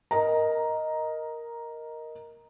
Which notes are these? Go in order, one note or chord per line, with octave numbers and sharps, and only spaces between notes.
A#4 D#5 A#5